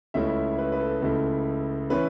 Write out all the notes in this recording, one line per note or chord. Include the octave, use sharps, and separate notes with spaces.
C#2 C#3 A3 C#4 E4 E5
B4
B4
A4
C#2 C#3 A3 E4 A4
E3 C#4 E4 B4